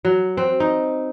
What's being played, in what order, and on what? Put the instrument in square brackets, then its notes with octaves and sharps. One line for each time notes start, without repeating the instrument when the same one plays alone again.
[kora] F#3
C4
D#4